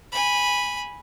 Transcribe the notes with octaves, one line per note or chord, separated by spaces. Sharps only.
G#5 B5